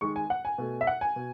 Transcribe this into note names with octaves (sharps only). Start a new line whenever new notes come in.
D#3 G#3 C#6
G#5
F#5
G#5
B2 A3
E5
F#5
G#5
B2